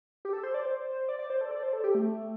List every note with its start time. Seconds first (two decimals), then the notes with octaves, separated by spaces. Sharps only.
0.25 G4
0.33 A4
0.43 C5
0.54 D5
0.65 C5
1.08 D5
1.19 D5
1.30 C5
1.41 A4
1.51 D5
1.63 C5
1.73 A4
1.84 G4
1.95 A3